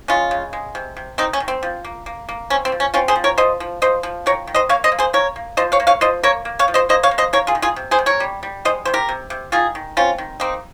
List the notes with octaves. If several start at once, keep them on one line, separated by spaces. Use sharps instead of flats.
G#3 C#4 F4
C#3
G#3
C3
C3
D#3 C4 D#4
C#4
D#3
C4
F3
A#3
A#3
A#3
C4 C#4
C4
F3
C#4
C4 C#4 F4
G#4 C5
F3
A#4 C#5
F3 C5 D#5
F3
F3 C5 D#5
F3
D#3 A#4 C#5
D#3
C5 D#5
A#3 C#5 F5
C5 D#5
A#3
G#4 C5
A#3 A#4 C#5
A#3
F3 C5 D#5
C#5 F5
A#3
C#5 F5
F3 C5 D#5
A#3 A#4 C#5
A#3
C#5 F5
F3
C5 D#5
A#3 C5 D#5
C#5 F5
A#3
C5 D#5
A#3 A#4 C#5
F4 G#4
D#3
F4 G#4
C3
G#4 C5
C3
A#4 C#5
G3
G3
G#3 C5 D#5
C3 C5
G4 A#4
C3
C3
D#3 F4 G#4
D#3
C4 C#4 F4
D#3
A#3 C4 D#4